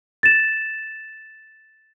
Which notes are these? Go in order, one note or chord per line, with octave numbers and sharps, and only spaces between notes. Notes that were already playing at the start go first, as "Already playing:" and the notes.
A6 E7